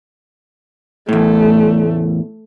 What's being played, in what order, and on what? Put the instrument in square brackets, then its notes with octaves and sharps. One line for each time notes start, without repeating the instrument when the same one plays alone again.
[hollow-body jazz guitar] E2 A2 [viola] A3